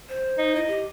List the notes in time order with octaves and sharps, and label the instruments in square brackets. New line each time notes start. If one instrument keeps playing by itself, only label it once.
[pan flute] C5
[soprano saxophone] D#4
[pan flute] E4 [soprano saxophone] D#5
[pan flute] G4